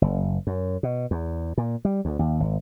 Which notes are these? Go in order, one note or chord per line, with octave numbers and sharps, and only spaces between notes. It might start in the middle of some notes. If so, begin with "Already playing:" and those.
F#1
F#2
B2
E2
A#2
G3
D2
D#2
G#1